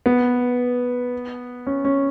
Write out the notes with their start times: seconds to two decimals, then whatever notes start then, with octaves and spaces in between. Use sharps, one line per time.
0.06 B3
1.67 C#4
1.85 C#4